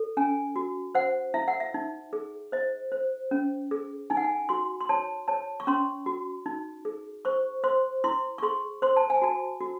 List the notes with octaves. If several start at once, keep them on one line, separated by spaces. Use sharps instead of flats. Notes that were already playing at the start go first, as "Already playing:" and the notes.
Already playing: A4
C#4 G#5
F#4
C5 F#5
E4 E5
F#5
E5
D#4
G#4
C5 D#5
C5
C#4
G#4
D#4 G#5
F#5
G#5
F#4 C6
C6
C#5 A5
C#5 A5
C#6
C#4 C6
F#4
D#4
G#4
C5 C#6
C5 C6
E4 C6
C#6
G#4 C6
C5 C6
A5
G#5
F#4 A5
F#4